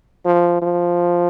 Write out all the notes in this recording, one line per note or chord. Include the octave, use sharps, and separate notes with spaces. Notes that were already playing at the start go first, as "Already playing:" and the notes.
F3
F3